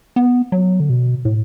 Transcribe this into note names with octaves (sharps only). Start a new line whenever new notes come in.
B3
F#3
D3
B2
A2